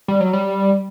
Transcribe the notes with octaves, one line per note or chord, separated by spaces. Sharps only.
G3
F#3
G3